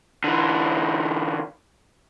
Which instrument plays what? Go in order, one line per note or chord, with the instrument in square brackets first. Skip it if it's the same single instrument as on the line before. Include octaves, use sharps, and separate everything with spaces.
[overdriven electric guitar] D3 E3